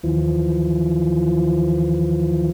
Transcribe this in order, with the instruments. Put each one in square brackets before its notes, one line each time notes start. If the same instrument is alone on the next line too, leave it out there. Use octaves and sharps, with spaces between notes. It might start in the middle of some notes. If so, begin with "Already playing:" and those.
[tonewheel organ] D#2 E3 F3